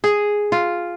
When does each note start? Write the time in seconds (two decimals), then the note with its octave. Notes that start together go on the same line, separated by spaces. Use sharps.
0.04 G#4
0.52 F4